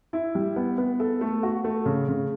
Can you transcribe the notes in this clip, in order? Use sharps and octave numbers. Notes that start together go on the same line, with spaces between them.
E4
G3
B3
B3
A4
A3
F#4
A3
C#3
C#3